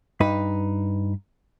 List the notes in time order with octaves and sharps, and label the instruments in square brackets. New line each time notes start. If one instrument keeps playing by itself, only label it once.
[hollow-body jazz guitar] G2 D#4 B4 B5